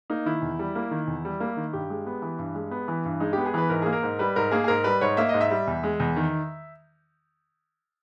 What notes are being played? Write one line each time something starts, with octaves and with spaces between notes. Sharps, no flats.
A#3 D#4
D#3 E4
E2
G3
A#3
D#3
E2
G3
A#3
D#3
G2 G4
G#3
B3
E3
G2
G#3
B3
E3
G2
G#3 D#4
B3 G4
G#4
E3 B4
G#2 A#4
A#3 G#4
A#4
G#2
G3 B4
G#2 A#4
A#3 G#4
G#4
G#2 A#4
G3 B4
G#2 C#5
A#3 E5
G#2 D#5
E5
G3
E2
G#3
E2
D#3